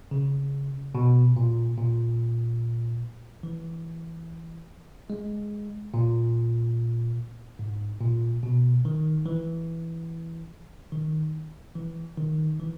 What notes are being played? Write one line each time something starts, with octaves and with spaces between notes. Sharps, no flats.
C#3
B2
A#2
A#2
E3
G#3
A#2
G#2
A#2
B2
D#3
E3
D#3
E3
D#3
E3